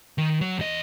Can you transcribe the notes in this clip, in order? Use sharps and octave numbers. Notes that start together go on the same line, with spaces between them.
D#3
F#3
E2 D#5